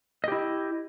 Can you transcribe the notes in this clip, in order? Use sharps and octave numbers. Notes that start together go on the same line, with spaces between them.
E4 G4 D#5